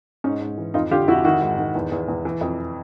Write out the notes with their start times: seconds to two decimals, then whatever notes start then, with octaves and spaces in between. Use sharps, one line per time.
0.24 G#2 C#4 D#4
0.41 G#2
0.58 E3
0.74 F2 D#4 F4
0.91 D3 F4 G4
1.08 F2 E4 F#4
1.24 D#3 E4 F#4
1.41 G#2
1.58 D#3
1.75 E2
1.92 E2
2.08 E2
2.25 E3
2.41 F2